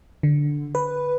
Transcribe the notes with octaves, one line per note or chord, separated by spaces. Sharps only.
D3
B4